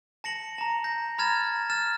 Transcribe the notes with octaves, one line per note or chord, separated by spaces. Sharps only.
A5 A#6 C#7 F#7
A5 A#5
G6 A#6
A#5 B5 F6 G#6 A6 E7
F6 A6 E7